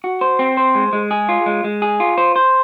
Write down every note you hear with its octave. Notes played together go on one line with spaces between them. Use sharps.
F#4
C5
C4
C5
G#3
G#3
G#4
F4
G#3
G#3
G#4
F4
C5
C5